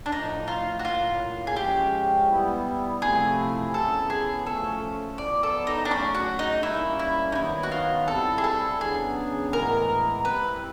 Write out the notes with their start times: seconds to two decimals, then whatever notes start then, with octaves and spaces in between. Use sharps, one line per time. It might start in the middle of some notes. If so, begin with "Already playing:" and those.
0.06 D4
0.12 A2 F3 A3 D#4
0.48 F4
0.79 F#4
0.84 A2 F#3 A#3 F4
1.47 G#4
1.56 F3 G#3 C#4 G4
2.29 G3 B3 E4
3.01 C3 F3 A3 C4 E4 G#4
3.74 C#3 F#3 B3 E4 A4
4.10 G#4
4.46 F3 A3 C#4 A4
5.18 F#3 B3 E4 D5
5.43 A4
5.67 D#4
5.85 D4
5.91 C#3 F#3 A3 C#4
6.15 F#4
6.39 D#4
6.63 G3 A#3 C#4 E4
6.99 E4
7.32 D#4
7.35 D#3 F#3 B3 E4
7.63 F#4
7.71 F4
8.08 G3 C4 E4 A4
8.38 G#4
8.44 A4
8.80 C#3 F#3 B3 D4 G#4
9.53 A2 E3 G#3 B3 E4 A#4
10.25 G3 C4 E4 B4